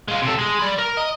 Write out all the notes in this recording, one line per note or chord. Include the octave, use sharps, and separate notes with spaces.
G#3 F4
C3 A4
G#3
D5 B5
A#4
D#5